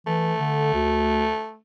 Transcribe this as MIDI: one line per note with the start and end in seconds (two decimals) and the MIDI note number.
0.07 0.33 52
0.07 1.57 57
0.40 0.73 50
0.74 1.28 38